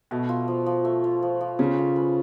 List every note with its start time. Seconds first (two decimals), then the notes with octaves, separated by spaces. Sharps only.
0.11 B2 A3
0.29 F4
0.48 F3
0.66 F3
0.85 A3
1.04 F4
1.23 F3
1.41 F3
1.59 C#3 C#4
1.78 F4
1.96 B4